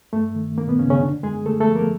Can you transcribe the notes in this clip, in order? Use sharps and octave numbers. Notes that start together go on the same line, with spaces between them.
G2 A3
D#3
D#3 A#3
B2 B3
G2 C#3 C#4
C#3 C#4
F#2 D3 D4
F#2 G#3 G#4
D3 A3 A4
A3 A4
F3
A#3 A#4